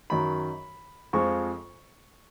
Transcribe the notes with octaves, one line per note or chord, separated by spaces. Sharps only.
F#2 D#3 F#3 B5
F2 F3 G#3 C#6